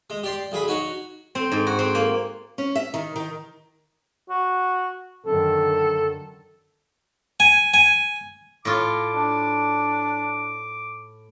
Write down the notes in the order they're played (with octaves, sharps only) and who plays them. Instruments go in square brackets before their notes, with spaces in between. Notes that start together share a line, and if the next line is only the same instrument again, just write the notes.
[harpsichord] G#3
G4 D5 C6
B1 G#4 B5
D#4 F#4 C#5
[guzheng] C4
G#2
F#4
C4
A#3
[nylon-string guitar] C#4
E5
D#3
D#3
[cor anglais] F#4
[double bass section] F#2 D3 D#3 [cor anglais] A4
[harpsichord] G#5
G#5
[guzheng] A2 F4 [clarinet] D6
[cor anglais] D4